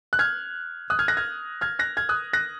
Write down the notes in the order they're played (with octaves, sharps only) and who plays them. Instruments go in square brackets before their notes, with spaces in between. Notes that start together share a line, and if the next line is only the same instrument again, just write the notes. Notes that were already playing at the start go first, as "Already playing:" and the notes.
[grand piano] F#6
F6 G#6
D#6 F#6
F6 G#6
F#6 A#6
F6 G#6
F6 G#6
F#6 A#6
F6 G#6
D#6 F#6
F#6 A#6